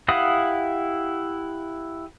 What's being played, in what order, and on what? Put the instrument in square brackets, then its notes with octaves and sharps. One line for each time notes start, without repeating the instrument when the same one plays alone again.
[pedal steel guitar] E4 G4 F5 F#5 D#6